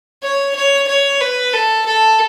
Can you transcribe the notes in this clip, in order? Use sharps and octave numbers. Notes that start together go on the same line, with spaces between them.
C#5
C#5
C#5
B4
A4
A4